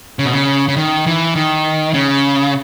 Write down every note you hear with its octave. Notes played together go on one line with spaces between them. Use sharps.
C#3
B2
C#3
C#3
D#3
E3
D#3
C#3